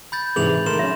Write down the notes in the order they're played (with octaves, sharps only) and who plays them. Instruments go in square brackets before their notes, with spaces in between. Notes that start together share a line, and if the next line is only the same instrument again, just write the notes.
[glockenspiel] B5 G6 A6
[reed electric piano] G#2 C3 E3 [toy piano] G#4 [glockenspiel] F7 F#7
[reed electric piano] D#3 A3 A#4 [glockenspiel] C6 E7
[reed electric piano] F#3 C#4 [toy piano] E5